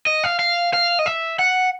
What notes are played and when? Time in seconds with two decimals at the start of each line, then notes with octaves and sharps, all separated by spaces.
0.07 D#5
0.24 F5
0.39 F5
0.73 F5
0.99 D#5
1.06 E5
1.39 F#5